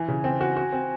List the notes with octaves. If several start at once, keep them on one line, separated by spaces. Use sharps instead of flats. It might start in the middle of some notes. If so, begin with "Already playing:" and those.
Already playing: E3 G#5
C#3
C4
F#4
F#4
C4